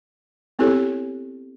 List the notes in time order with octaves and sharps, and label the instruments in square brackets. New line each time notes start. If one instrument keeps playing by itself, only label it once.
[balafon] B3 C4 E4 G4 A4 C#5